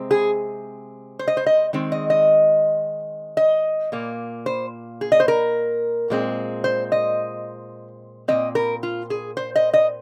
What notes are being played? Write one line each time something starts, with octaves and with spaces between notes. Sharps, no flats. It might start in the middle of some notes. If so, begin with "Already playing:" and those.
Already playing: C3 G#3 C4
G#4
C5
D#5
C5
D#5
D#3 G#3 C4
D#5
D#5
D#5
A#2 A#3
C5
G#4
D#5
C5
A#4
A#2 G#3 C4
C5
D#5
A#2 G#3 C4 D#5
A#4
F4
G#4
C5
D#5
D#5